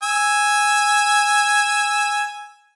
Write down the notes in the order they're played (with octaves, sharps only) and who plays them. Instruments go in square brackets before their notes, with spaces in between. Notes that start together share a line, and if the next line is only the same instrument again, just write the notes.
[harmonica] G#5 E6